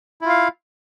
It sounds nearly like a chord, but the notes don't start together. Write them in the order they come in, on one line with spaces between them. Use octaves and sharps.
E4 F4 F5